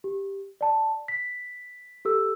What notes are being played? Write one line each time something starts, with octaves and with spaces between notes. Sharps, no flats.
G4
D5 A5
B6
G4 A4 E6